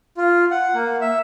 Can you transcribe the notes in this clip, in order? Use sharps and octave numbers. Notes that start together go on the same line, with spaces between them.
F4
F#5
A#3
E5